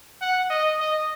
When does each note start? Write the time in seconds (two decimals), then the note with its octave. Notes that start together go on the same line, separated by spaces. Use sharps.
0.21 F#5
0.50 D#5
0.80 D#5